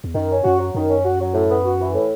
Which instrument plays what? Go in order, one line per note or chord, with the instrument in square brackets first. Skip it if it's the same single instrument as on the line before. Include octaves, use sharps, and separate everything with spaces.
[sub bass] E2
[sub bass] F#2 [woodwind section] D#3
[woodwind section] C#4
[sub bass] F#2 [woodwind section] F#4
[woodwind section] F#3
[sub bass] F#2 [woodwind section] D#3
[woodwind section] C#4
F#4
F#3
A2
B3
F#4
E3
A2